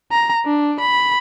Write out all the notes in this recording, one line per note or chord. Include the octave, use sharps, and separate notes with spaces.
A#5
D4
B5